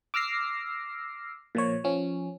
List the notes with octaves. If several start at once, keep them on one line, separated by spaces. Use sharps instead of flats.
D6 E6 F6 A#6 C7
A#2 F3 C#5
F3 C#4